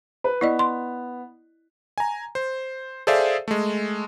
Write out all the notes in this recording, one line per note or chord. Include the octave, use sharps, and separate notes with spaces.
B4
B3 E4 D5 D#5
C6
G#5 A#5
C5
G#4 A4 C5 D5 E5 F5
G#3 A3